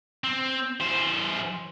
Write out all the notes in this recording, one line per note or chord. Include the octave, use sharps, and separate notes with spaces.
C4
E3 C5